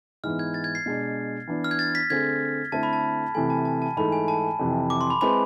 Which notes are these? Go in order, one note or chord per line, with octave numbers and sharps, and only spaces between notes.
G#2 E3 B3 F6
G#6
A6
G#6
C7
B2 G#3 D4
E3 B3 D4
F6
G#6
A6
B6
D3 A3 C4 G#4 G#6
D3 A3 C4 E4 A4 A5
B5
A5
C3 E3 A3 G#5
A5
A5
A5
G#2 E3 A3 B5
G#5
A5
F2 C3 E3
D6
C6
B5
G#3 C4 E4 B4 B5